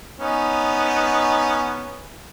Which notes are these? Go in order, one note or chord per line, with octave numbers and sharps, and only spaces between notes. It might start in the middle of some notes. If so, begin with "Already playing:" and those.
B3 C#4 D#4